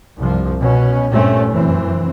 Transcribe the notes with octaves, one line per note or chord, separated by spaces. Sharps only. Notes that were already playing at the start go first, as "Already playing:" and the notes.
C2 G2 F3
B2 C#4
G2 A#2 A3 C4 C#4
F1 F#2 E3 C4